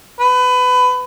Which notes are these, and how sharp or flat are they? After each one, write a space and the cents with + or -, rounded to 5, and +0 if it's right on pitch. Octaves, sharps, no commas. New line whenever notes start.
B4 +25